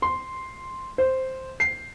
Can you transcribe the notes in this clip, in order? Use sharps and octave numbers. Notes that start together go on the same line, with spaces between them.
C6
C5
C7